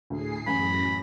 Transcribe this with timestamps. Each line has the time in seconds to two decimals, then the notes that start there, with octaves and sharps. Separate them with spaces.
0.10 D2 A2 G#4 C7
0.47 A1 F#2 G#5 B5 A#6